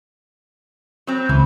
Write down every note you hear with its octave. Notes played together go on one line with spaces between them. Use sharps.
F#3 C4
C#2 E3